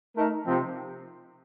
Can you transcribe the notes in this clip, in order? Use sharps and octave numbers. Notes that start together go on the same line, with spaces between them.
A3 D#4 A#4
C3 F3 C4